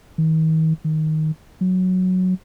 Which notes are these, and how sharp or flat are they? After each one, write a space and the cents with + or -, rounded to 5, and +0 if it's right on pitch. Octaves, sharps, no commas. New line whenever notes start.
D#3 +40
D#3 +5
F#3 -5